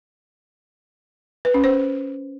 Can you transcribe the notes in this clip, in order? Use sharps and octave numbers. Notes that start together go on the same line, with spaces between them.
B4
C#4
C5